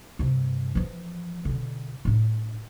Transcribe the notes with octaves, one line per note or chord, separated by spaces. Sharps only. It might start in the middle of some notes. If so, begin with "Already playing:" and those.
G2 C3
E3 F3
B2 D3
A2 D4